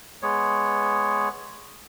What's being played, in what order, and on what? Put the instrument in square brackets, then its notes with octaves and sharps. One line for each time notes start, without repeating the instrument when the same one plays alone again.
[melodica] G#3 B3 C#5